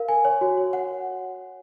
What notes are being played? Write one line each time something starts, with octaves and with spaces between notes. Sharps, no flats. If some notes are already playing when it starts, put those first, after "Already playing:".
Already playing: A#4 F5
G#5
C#5
F#4
C#5
F#5